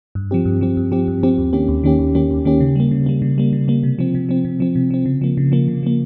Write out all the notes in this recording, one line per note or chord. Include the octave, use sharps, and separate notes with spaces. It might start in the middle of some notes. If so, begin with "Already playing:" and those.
G2
F3 C4 G4
G2
F3 C4 G4
G2
F3 C4 G4
G2
F3 C4 G4
D#2
D#3 A#3 C#4 G4
D#2
D#3 A#3 C#4 G4
D#2
D#3 A#3 C#4 G4
D#2
D#3 A#3 C#4 G4
C#3
G3 A#3
C#3
G3 A#3
C#3
G3 A#3
C#3
G3 A#3
C3
F3 C4
C3
F3 C4
C3
F3 C4
C3
F3 C4
C#3
F3 A#3
C#3
F3 A#3
C#3
F3 A#3